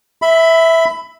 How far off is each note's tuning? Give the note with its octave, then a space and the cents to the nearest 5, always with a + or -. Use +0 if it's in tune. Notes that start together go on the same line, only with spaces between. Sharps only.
E5 -5 B5 +20